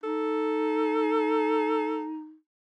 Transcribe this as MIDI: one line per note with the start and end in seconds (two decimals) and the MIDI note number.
0.04 2.35 63
0.04 2.08 69